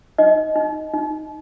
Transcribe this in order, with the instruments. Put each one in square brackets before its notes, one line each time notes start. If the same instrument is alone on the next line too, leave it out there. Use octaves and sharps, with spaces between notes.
[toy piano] D#4 D#5
D#4
D#4